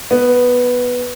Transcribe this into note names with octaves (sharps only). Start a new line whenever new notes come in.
B3